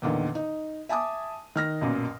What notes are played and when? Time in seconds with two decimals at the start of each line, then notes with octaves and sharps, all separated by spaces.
0.02 E2 A#2 D3 D#3
0.35 D#4
0.89 E5 G#5 A5 D6 D#6
1.56 D#3 F6 A#6
1.81 B1 F#2 A#2